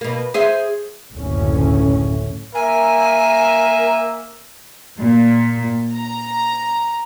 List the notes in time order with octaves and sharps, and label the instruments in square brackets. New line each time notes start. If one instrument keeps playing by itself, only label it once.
[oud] B2 A#3
G#4 C5 E5
[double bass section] F#1 D2 A2 C#4
[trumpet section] A#3 E5 [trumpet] A#4 [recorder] G#5
[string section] A#2
A#5